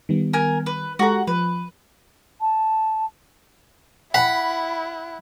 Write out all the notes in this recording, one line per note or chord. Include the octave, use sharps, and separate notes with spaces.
D#3 G3 B3
A#4 G#5
B4
G#3 F#4 G4 A4 A#5
F3 B4
A5
E4 F#5 B5